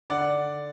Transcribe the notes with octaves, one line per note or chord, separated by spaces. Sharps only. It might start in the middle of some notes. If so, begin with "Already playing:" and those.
D3 D5 F#5